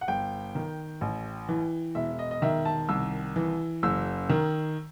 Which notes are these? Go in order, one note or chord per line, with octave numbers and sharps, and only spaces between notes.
F#5
G1 G5
D#3
A1
E3
E1 E5
D#5
D#5
D#3 E5
A5
C2 E6
E3
F#1 E6
D#3